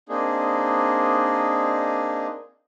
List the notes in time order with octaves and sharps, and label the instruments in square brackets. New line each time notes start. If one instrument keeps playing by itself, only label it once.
[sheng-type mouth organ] A#3 C4 D4 D#4 G#4